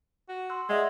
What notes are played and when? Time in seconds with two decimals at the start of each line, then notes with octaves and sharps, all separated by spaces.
0.29 F#4
0.50 C6 E6 F#6
0.69 G#3 D5 E5 F#5